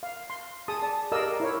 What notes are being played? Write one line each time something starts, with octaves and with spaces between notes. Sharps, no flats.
F5
C6
G#4 A5 D#6
D5 A5
G4 A#4 D5 D#5 F5 E6
E4 A#4 C#5